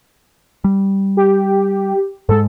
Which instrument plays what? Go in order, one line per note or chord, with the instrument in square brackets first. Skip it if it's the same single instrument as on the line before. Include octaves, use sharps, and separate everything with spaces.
[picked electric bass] G3
[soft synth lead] G4
[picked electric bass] G#2 G#3 [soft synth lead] A4